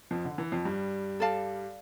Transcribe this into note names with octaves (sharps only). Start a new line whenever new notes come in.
F2 F3
D3
E3
F2 F3
G2 G3
A4 D5 F5 A5